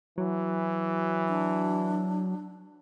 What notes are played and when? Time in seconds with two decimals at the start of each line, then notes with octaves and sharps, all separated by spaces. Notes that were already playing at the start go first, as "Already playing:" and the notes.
0.18 E3 F#3
1.29 D4